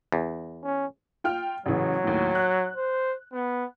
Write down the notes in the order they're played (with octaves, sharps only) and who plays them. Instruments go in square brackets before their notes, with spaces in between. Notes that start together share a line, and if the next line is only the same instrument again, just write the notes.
[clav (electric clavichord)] E2
[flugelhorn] C#4
[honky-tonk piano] F4 G5 F6
[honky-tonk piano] A1 C#3 E3 [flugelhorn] F#3
[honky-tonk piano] D#2 A2
F#6
[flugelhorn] C5
B3